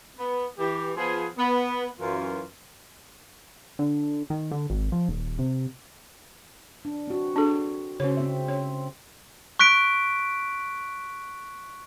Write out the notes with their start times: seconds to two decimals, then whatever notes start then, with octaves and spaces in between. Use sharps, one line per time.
0.17 B3
0.58 E3 G4
0.97 F3 B3 G#4
1.37 B3
2.00 F#2 E3 F4
3.79 D3
4.30 D#3
4.51 D3
4.70 G#1
4.92 F3
5.09 D#1
5.39 C3
6.85 D4
7.08 C4 F#4
7.36 D4 G#4 A4
8.00 C#3 C#4 F#4 C5 C#5
8.17 C4 E5
8.48 C#4 C#5
9.59 C#6 F#6 B6 D7